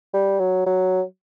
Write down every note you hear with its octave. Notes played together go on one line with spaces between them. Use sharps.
G3
F#3
F#3